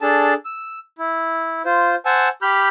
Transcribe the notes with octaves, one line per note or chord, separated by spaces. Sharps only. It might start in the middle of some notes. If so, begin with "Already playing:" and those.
D4 G#4 A4 A5
E6
E4
F4 C5
C5 F#5 G#5 A5 E6
G4 B5 F6 G6